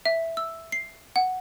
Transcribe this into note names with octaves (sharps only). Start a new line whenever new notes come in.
E5
E6
C7
F#5